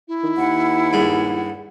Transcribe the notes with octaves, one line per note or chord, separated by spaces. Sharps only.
E4
D#3
D#2 F#5
G2 G#3